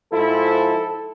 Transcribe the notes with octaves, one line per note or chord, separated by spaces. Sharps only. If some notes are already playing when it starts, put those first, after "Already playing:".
G#2 F3 E4 A4